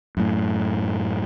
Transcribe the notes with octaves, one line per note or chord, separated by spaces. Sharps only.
F#2 A2